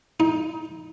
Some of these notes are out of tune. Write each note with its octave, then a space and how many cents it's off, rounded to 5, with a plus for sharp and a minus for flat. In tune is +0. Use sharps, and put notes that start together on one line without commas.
D#4 +20